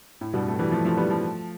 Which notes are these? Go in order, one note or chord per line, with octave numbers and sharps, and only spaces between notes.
A2
G2 B2
A3
E3 G3
F3 A3
F3 A3
G3 B3
F3 A3